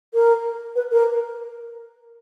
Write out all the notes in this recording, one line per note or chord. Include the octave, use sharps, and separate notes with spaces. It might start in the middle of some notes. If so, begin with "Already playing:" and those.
A#4
B4
A#4